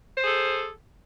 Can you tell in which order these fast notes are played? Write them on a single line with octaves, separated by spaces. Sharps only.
C5 G#4 A4